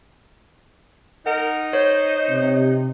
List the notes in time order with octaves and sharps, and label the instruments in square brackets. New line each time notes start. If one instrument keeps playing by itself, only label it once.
[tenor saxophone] D#4 [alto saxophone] A#4 [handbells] F#5
[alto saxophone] C5 [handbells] C#5
[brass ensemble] C3